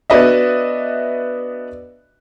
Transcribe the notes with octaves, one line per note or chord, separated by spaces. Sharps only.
B3 D4 F#4 B4 D#5 E5